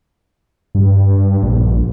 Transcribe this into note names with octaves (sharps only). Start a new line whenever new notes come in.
G2
A#1